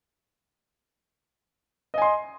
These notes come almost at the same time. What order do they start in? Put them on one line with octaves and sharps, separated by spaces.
D#5 G#5 C6